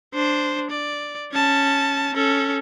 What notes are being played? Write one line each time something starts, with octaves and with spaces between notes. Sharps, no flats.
D4 C5
D5
C#4 A5
C#4 A4